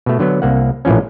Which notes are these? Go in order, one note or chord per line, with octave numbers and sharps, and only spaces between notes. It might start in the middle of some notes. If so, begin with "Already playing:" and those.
B2 A3
D3 F#3 B3
C2 A#3 F#5
A#1 A2 E3 F3 C#4